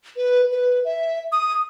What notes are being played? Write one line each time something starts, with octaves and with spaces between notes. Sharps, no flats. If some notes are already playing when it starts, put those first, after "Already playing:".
B4
B4
E5
D#6